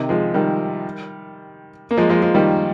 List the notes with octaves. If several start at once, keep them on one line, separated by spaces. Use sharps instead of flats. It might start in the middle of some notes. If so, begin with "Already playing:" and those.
Already playing: C3 D#3
F3 G#3
D#3 G3
A#3
F3 G#3
F3 G#3
F3 G#3
D#3 G3